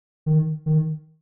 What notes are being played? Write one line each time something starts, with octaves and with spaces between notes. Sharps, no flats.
D#3
D#3